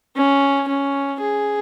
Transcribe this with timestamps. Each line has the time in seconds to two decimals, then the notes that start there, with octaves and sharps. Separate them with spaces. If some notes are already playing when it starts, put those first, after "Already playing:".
0.16 C#4
0.68 C#4
1.21 G#4